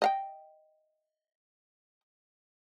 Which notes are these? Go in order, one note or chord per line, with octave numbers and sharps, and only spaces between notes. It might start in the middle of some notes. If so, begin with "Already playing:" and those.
D#5 F5 G5